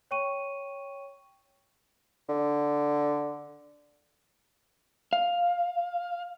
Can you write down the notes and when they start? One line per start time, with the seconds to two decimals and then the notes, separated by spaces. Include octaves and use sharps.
0.11 C#5 G5 C#6 D#7
2.29 D3
5.13 F5